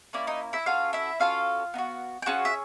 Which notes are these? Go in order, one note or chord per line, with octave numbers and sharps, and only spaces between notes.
A#3 C#4 E4 D5
D#4 D#5
E4 E5
C#4 F4 F#4 A4 F5
E4 E5
C#4 F4 F#4 A4 F5
B3 D#4 F#4
G5
C#4 F4 F#4 G#4 F#5
E5